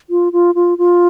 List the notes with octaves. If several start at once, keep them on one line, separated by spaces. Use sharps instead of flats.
F4
F4
F4
F4